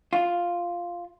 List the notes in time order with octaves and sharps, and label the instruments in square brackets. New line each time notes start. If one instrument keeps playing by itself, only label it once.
[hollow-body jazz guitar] F4